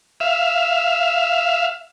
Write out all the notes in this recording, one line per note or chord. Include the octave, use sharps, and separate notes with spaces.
E5 F5